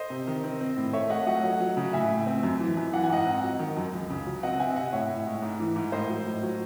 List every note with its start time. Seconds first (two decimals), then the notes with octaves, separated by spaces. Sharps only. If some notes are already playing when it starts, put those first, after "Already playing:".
Already playing: C5 D#5
0.10 C3
0.27 D#3
0.44 C4
0.61 C4
0.77 A2
0.93 A3 C#5 E5
1.10 A3 D#5 F#5
1.27 F#3 D#5 F#5
1.43 F#3
1.60 F#3
1.77 C#3
1.93 A2 E5 G#5
2.10 A2
2.26 C4
2.43 F#2
2.60 E3
2.77 F#2
2.93 E3 F#5
3.03 G#5
3.10 G#2 D#5 F#5
3.26 C4
3.43 F#3
3.59 D#3
3.77 F#2
3.93 C#2
4.10 C#3
4.26 F#3
4.43 C4 D#5 F#5
4.60 C4 E5 G#5
4.76 C3 D#5 F#5
4.93 A2 C#5 E5
5.10 A2
5.26 G#3
5.42 G#2
5.59 E3
5.76 G#2
5.92 A2 C5 D#5
6.10 F#3
6.26 A2
6.43 F#3